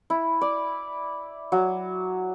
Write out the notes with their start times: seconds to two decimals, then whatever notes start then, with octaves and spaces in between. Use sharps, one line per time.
0.10 E4
0.41 D5
1.52 F#3